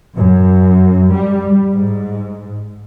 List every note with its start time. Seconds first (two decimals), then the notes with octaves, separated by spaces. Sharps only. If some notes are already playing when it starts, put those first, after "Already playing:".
0.15 F#2
1.13 G3
1.72 G#2